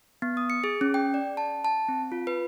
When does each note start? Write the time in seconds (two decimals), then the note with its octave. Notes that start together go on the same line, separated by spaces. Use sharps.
0.22 B3
0.37 D#6
0.50 C#7
0.64 G#4
0.81 C#4
0.94 G5
1.14 D5
1.37 A5
1.65 A5
1.88 C4
2.12 F4
2.27 B4